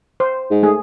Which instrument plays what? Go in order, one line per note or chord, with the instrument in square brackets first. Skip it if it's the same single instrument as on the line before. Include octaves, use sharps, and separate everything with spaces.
[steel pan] C5
[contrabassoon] G#2
[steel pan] A3 G#4